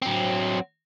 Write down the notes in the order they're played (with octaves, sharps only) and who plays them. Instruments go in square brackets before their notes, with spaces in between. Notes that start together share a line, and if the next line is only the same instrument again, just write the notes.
[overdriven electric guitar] F#3 C4